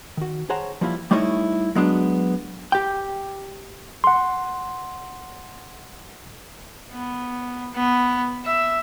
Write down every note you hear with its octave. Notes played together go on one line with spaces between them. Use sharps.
D#3 F#4
G#4 C5 C#5 F#5 A5 A#5
F3 G3 A#3 D4 E4 F4
G3 A3 D#4 E4 C#5 D#5
F#3 G#3 B3 D4
G4 G5
F#5 C6
B3
B3
E5